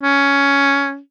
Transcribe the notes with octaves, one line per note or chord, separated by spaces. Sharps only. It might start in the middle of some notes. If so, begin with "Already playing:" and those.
C#4